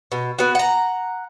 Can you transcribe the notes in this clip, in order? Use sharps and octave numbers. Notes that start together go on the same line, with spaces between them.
B2
B3 F#4
F#5 A#5